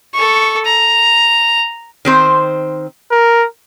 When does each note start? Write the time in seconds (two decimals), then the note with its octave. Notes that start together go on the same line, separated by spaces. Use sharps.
0.14 A4 C#6
0.65 A#5
2.05 D#3 C4 C5
3.11 A#4